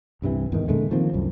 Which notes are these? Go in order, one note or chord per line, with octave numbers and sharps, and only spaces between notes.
C2 G2 C3 E3
E2 G#2 D#3
A#2 D3 G#3 A3
D#3 F3 A#3 C4
C2 F#2